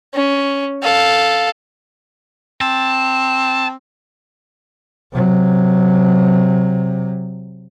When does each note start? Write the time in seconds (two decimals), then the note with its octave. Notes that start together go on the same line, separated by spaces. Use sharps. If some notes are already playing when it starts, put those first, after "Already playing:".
0.14 C#4
0.82 A4 F5
2.61 C4 A5
5.12 C3 F#3